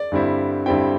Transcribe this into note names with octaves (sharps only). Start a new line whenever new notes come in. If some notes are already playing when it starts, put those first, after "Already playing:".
Already playing: D5
G2 D3 G3 C4 E4
G2 D3 G3 C4 E4 G5